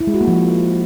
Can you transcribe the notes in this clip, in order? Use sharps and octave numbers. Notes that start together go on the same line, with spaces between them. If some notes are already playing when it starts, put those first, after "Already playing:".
E4
G#3
F#4
A#3
F3